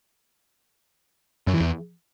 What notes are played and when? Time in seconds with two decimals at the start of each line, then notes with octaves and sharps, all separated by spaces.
1.47 F#2
1.54 E3
1.60 E2